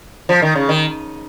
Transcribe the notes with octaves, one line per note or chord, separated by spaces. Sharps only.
F3
D#3
C#3
D#3